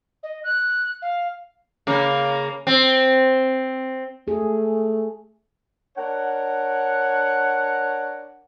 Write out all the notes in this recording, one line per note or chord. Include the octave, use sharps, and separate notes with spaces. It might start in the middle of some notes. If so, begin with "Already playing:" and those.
D#5
F#6
F5
C#3 A#3
C4
A3 G#4
D4 A#4 C#5 F#5